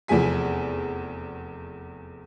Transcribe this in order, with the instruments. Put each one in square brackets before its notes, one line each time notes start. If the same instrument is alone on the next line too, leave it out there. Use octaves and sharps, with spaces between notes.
[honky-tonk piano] F1 E2 F3 G#4 G#5 B6